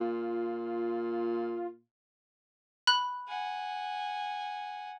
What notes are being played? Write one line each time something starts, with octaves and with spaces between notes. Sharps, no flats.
A#2 F4
B5 F#6
F#5 G#5